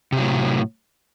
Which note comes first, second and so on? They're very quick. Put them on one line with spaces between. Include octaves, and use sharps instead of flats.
C3 F#3 A2